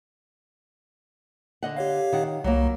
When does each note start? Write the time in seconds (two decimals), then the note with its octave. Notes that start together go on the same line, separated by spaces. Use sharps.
1.63 D3 D#5 F#5
1.77 G4 C#5 F5
2.12 D#3 F#5
2.44 C2 F#3 A#3